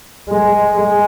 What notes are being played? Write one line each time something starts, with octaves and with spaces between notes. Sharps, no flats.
G#3
G#3